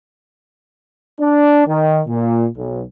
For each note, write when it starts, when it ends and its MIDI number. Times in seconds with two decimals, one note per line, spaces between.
1.20 1.64 62
1.67 2.01 51
2.08 2.47 46
2.57 2.82 35